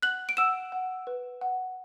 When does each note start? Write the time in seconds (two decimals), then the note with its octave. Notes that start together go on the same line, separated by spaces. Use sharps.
0.02 F#5 F#6 F#7
0.29 D7
0.37 F#5 E6 E7
0.72 F#5
1.07 B4
1.41 F#5